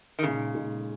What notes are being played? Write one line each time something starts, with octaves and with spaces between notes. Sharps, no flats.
D#3
A#2 C#3 G#3 D#4 G#4
A#2 G#3 D#4 G#4